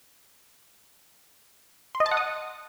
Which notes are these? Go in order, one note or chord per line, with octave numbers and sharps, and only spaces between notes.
C6
D#5
A5
F#5
D#6